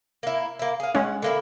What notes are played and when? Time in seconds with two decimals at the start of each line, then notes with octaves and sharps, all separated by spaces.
0.23 A#3 E4
0.59 A#3 E4
0.80 G#4 F5
0.95 G#3 C#4 F#5
1.22 D3 A#3 E4